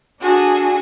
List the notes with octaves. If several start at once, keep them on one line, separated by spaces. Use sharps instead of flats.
D4 F#4 G#4 A4